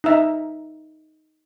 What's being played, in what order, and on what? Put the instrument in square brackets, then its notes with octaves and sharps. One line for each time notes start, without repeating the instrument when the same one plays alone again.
[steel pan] D#4 E5 A#5